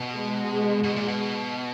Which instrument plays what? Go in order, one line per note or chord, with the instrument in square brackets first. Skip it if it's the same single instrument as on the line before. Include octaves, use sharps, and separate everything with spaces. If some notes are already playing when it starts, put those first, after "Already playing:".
Already playing: [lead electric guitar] B2
[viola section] G#3
[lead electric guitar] B2
A#2
B2